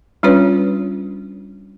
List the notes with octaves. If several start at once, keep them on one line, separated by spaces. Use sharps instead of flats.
G3 C#4 D4 F4 B4 C#5